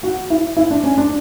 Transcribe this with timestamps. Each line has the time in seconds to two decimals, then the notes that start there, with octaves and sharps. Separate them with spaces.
0.03 F#4
0.30 E4
0.57 E4
0.71 D4
0.84 C#4
0.98 D4